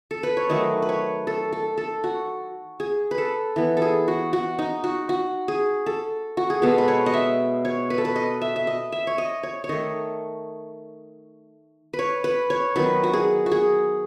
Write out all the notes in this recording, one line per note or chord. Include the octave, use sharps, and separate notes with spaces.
A4
B4
C#5
D#3 F#3 A3 D#5
B4
C#5
A4
A4
A4
F#4
G#4
B4
A4
E3 B3
A4
G#4
F#4
F#4
D#4
F#4
F#4
G#4
A4
F#4
G#4
B2 G#3 B3 A4
B4
C#5
D#5
E5
C#5
B4
A4
B4
D#5
E5
E5
D#5
E5
C#5
D#5
C#5
C#5
D#3 A3 D#5
B4
C#5
B4
C#5
D#3 F#3 B3 B4
F#4
G#4
F#4
G#4